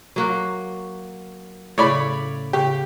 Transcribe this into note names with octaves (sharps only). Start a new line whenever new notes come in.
F#3 A#3 F#4
A2 C#3 C#5 D5 B5
C#3 G4